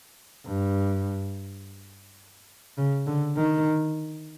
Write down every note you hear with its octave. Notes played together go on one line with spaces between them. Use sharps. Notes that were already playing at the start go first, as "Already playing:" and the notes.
G2
C#3
D3
D#3